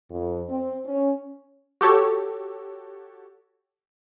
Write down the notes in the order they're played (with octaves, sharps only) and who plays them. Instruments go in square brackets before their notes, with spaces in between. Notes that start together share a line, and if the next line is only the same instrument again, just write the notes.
[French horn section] F2
C4
C#4
[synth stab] F#4 G4 A4 C#5